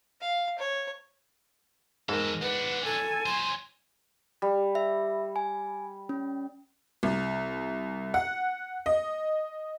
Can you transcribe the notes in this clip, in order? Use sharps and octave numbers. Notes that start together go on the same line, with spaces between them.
F5
C#5
E2 G#2 A4 A#4
B1 D4 B4 F#5
A4 G#5
F#3 C5 C6
G3
E5
G#5
C#4
C2
F#5
D#5